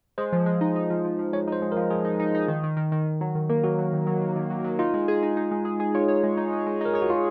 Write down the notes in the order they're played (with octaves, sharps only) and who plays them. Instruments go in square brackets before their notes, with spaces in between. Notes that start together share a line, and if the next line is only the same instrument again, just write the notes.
[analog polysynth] G#3 [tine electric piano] C5
[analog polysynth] F3
G#3
D#4
D#4
F3
F3
F3
[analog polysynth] G#3 [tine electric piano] C#5
[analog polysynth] D#4 [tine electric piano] C5
[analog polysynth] G#3
[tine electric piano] A#4
[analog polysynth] F3
[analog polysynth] F3 [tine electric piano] G#4
[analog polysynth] D#4
D#4
D#4
D#3
D#3
D#3
D#3
D#3
F#3
D#3
A#3
[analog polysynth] F#3 [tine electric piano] F#4
[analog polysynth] F#3
D#3
F#3
F#3
D#3
F#3
F#3
[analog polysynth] D#4 [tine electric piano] F4
[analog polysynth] G#3
G#4
D#4
D#4
G#3
G#4
G#4
[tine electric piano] F4 [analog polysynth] C#5
[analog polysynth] C#5
G#3
D#4
D#4
G#3
[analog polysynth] D#4 [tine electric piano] A#4
[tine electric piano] G#4 [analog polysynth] C#5
[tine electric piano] F#4
F4